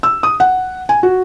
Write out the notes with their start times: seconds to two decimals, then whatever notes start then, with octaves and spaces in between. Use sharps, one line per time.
0.03 E6
0.23 D#6
0.40 F#5
0.89 G#5
1.03 F#4